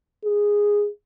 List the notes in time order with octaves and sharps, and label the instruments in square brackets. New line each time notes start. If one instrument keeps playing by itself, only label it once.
[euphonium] G#4